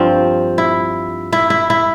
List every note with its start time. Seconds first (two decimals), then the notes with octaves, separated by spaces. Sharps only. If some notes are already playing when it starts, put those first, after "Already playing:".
Already playing: G2 F3 C4
0.58 E4
1.33 E4
1.50 E4
1.70 E4